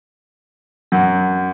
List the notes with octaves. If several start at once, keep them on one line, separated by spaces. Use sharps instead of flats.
F#2